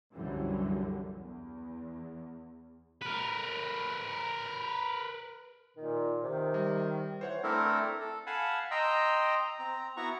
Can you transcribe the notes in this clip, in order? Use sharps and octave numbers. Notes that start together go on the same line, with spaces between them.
C2 F#2 D3 E3 G3
E2
A#4 B4
A#2 D#3
C3 D#3
G3
E3 C5 C#5 F#5
A3 C4 D4 E4 A4 A#4
A4
F5 F#5 G#5 A5 B5
D#5 G5 A#5 C6 E6
C4 A#5
B3 E4 F#4 F#5 A#5 C#6